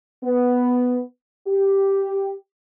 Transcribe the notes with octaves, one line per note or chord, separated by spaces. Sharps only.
B3
G4